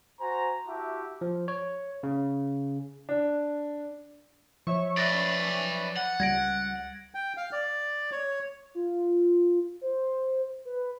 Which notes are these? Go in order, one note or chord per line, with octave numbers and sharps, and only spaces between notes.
F#4 C5 G#5 A#5
E4 F#4 G4 E5 A5 D6
F3
C#5
C#3
D4
F3 C#5 E5 C#6
B4 D5 A6 A#6
F#5
C#2 G3 G#6 A#6 D7
G5
F5
D5
C#5
F4
C5
B4